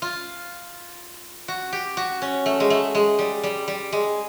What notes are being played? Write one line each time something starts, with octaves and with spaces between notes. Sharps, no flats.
F4
F#4
G4
F#4
C#4
A3
G#3
A3
G#3
G3
G3
G3
G#3